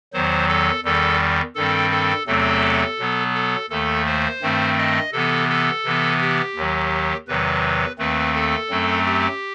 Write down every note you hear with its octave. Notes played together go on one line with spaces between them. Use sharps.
E2 D#3 F#3 C5
A4
E2 D#3 G3 A4
G2 D#3 G3 C4 A4
A4
E2 C3 F#3 A3 C4 A4
B2 F#3 B3
A4
D#2 D#3 A3 A4
C5
G2 D#3 A3 C4
D#5
C3 E3 B3 A4
A4
C3 E3 B3
G4
D#2 D#3 F#3
E2 C3 D#3 F#3 B4
D#2 D#3 A3 C4 B4
A4
F#2 F#3 A3 C4
G4